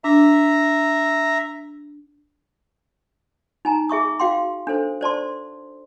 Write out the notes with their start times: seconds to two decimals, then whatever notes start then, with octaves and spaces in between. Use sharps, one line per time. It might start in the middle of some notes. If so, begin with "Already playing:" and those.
0.04 D4 E5 A#5
3.65 D#4 G#5 A#5
3.89 G#4 E5 C#6 D#6
4.20 F#4 F5 G5 C6
4.67 D4 A4 C5
5.01 C5 D5 A5 C6